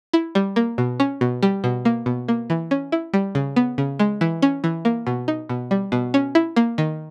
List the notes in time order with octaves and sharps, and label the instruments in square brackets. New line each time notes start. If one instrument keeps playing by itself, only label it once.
[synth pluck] E4
G3
A#3
B2
C#4
B2
G3
B2
A#3
B2
A#3
E3
C#4
E4
G3
C#3
B3
C#3
G#3
E3
C#4
E3
A#3
B2
D#4
B2
G3
B2
C#4
E4
A#3
D#3